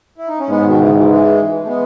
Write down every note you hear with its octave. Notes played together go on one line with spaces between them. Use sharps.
E4
D#4
C#4
G#2 G#3 B3
B2 D#3
C#3 E3
D#3
C#3 E3
E3 G#3
A3
G#3 B3